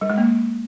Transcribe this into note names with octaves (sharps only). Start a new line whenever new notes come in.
G3
G#3
A#3